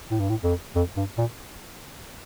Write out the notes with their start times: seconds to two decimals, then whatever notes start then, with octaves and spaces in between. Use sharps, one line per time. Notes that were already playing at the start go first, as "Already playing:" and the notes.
0.11 A2
0.20 G2
0.30 A2
0.44 F2
0.76 F2
0.97 G2
1.18 A#2